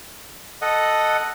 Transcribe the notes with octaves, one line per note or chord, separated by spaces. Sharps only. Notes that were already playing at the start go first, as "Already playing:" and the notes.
A4 D#5 F#5